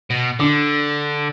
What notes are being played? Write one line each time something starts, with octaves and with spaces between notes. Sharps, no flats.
B2
D3 D4 D6